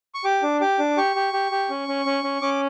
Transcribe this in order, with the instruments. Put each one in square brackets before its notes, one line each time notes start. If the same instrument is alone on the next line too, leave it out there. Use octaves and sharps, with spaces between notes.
[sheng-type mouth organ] C#6
G4 D6
D4
G4 D6
D4
G4 C#6
G4
G4
G4
C#4
C#4
C#4
C#4
C#4 D6